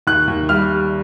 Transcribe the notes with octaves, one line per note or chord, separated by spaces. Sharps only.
D#2 F#6
D#2
G3 F6